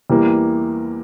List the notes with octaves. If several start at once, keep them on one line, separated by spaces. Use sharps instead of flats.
E2 E3 G3 A#3